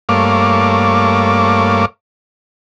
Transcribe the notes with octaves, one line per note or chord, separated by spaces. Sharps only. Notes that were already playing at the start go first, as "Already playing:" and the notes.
G2 A3 A#3 C#5 F5 D6